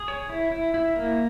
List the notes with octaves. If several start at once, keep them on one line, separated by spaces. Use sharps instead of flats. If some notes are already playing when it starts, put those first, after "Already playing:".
Already playing: G#4
C#5
E4
E4
E4
A#3